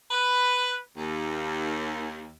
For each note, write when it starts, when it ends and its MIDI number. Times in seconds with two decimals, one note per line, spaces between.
0.11 0.76 71
0.97 2.35 39